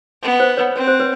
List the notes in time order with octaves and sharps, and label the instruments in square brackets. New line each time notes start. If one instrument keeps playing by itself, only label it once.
[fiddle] B3
[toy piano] C5
B4 C#5
[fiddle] C4 [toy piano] C#5
[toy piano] C5
B4 C#5